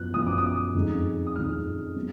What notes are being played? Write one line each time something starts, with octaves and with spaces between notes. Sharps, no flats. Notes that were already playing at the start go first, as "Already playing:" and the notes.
Already playing: F#2 F3 B3 F#6
F#2 F3 B3 D#6
D6
D#6
F2 F3 G#3 D#4
D#6
F2 F3 G#3 D#4 F6
F#3 B3